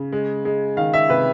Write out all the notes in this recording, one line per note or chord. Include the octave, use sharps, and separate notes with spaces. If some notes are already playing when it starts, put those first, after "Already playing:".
Already playing: C#3
G#3
G#3
D#3 F5
E5
C3 B4